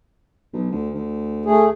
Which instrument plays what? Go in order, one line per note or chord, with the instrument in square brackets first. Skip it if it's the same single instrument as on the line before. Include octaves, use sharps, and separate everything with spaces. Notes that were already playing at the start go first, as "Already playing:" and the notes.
[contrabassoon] B1
D2
D2
[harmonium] A3 G#4